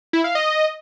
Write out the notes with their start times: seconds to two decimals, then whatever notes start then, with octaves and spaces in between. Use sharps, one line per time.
0.13 E4
0.24 F5
0.35 D#5